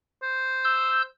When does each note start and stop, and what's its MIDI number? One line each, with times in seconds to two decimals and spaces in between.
0.22 1.06 72
0.64 1.02 88
0.64 1.02 91